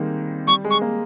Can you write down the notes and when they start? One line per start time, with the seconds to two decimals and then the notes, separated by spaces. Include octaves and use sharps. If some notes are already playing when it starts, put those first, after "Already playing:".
Already playing: D#3 G3 G#3 A#3 C4 D#4
0.47 G3 C#6
0.64 G#3
0.71 C#6
0.81 A#3